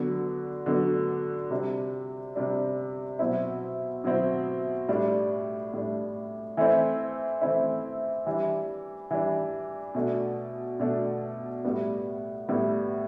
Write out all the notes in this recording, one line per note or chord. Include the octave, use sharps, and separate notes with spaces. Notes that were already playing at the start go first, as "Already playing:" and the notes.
Already playing: D3 F#3 B3 D4
D3 F#3 B3 D4
C3 G3 D4
C3 G3 D4
B2 F#3 C4 E4
B2 F#3 C4 E4
A2 G3 D4
A2 G3 D4
E3 A3 C4 E4
E3 A3 C4 E4
E3 G3 D4
E3 G3 D4
B2 A3 D4
B2 A3 D4
A2 G3 B3
A2 G3 B3